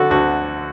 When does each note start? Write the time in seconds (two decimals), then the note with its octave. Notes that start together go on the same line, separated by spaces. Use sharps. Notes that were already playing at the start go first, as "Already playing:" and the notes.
Already playing: D3 F#4 A4
0.11 D2 F#4